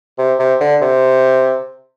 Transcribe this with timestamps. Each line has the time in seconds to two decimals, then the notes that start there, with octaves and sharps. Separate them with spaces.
0.18 C3
0.39 C3
0.60 D3
0.81 C3